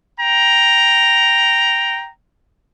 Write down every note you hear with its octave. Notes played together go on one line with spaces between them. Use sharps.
G5 A#5